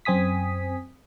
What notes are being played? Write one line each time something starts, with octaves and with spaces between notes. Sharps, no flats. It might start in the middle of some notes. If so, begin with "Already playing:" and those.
F#2 C4 G#5 D#6 B6